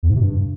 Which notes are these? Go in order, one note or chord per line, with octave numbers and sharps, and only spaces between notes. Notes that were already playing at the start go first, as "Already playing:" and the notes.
E2
G#2
C3
G2